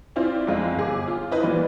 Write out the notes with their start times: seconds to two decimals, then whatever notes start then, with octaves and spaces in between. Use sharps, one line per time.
0.16 C4 E4 F4 C5 D5
0.47 F2 G#3 F5
0.77 G1 G#4 D6
1.08 F4
1.31 E4 B4 C5 D#5
1.43 A#2 E3 G3